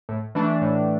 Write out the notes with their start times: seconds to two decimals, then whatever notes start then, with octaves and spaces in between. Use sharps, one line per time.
0.09 A2
0.35 E3 A3 D4
0.62 A2